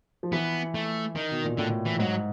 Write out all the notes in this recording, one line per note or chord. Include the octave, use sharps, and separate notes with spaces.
F3
E3 B3
A3
D#3
B2
A#2
A2 D3
E3
G#2 F#3